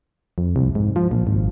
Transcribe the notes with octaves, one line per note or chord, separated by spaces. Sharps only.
F2
C2
G#2
F3
A#1
G#1